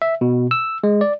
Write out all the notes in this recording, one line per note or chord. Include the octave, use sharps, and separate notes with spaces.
E5
B2
E6
G#3
D5